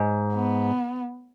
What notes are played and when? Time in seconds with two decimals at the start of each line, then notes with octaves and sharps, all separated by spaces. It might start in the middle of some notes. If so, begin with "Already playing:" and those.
Already playing: G#2
0.33 B3